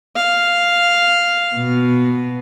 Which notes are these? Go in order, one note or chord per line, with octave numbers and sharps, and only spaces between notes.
F5
B2